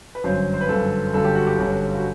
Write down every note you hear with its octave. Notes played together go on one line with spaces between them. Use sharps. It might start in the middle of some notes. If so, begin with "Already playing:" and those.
B4
G1 F#2 F#3 C5
C5
B4
G1 F#2 F#3 A4
G1 F#2 F#3 A4
G4
F#4
G4
G1 F#2 F#3
F#4